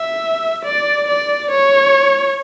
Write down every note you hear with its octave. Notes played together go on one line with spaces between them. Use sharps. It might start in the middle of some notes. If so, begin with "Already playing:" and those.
Already playing: E5
D5
D5
C#5